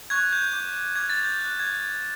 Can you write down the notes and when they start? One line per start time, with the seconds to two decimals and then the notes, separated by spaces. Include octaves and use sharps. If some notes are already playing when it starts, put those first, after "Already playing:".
0.10 C#6 F#6 G#6
0.33 G6
0.53 D6 G6
0.95 D6 F6 G#6
1.10 A6
1.24 G6
1.39 D6 F#6
1.60 G#6
1.82 D6 F#6